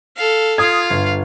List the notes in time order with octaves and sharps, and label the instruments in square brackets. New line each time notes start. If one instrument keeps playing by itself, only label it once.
[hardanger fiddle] A4 F5
[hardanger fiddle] F4 F5 [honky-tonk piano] D#6 G#6
[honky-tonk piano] G1